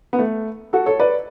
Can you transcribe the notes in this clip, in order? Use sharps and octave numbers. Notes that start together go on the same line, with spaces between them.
B3
A3
F#4 A4
A4 C#5
B4 D5